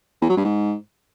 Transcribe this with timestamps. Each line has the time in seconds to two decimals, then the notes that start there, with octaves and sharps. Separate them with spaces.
0.22 E2
0.29 F#3
0.37 G2
0.44 G#2